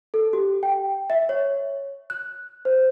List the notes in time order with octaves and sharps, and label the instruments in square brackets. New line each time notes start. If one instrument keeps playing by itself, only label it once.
[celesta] A4
G4
G5
E5
C#5
F#6
C5